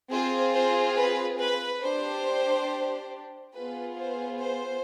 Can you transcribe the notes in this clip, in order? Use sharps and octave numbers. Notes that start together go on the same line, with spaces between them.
C4 F4 G#4 C5
C5
B4
B4
D4 G4 C5
B3 F4 G#4 B4
C5
C5